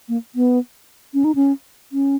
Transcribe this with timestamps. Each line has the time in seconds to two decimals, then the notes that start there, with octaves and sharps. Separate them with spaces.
0.09 A#3
0.35 B3
1.14 C#4
1.24 D#4
1.35 C#4
1.92 C#4